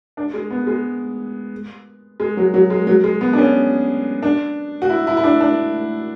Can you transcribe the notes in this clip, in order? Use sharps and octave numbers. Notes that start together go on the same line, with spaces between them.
D4
G#3
B3
G#3
G#3
F#3
F#3
G#3
F#3
G#3
B3
D4
C#4
D4
F#4
E4
E4
E4
D4
D4